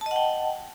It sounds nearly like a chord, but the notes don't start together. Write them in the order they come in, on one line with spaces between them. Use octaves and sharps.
A5 D#5 F#5 G5